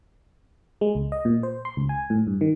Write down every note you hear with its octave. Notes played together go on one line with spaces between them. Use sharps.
G#3
C#2
D#5
A#2
C5
C6
C#2
G#5
A2
G2
D#3